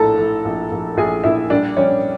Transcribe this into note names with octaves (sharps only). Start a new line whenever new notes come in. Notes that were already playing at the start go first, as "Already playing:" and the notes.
Already playing: A#1 A2 A4 A5 A#5
A2
A#1
A#1
A#1 G#4 G#5
A#1 E4 E5
G3 D4 D5
G3 C#4 C#5